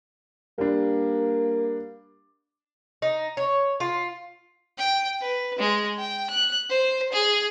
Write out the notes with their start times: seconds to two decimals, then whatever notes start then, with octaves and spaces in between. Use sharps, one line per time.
0.58 G3 A#3 D4
3.02 D#4
3.37 C#5
3.80 F4
4.78 G5
5.21 B4
5.59 G#3
5.99 G5
6.30 F#6
6.70 C5
7.13 G#4